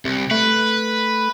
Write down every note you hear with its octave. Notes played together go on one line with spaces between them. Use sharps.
C2 C3
A3 B4